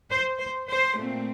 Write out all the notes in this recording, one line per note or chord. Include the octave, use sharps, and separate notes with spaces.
C5
C5
C5
A#2 A3 C4